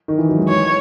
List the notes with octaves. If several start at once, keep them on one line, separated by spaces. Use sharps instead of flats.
D#3
E3
F#3
G#3
C#5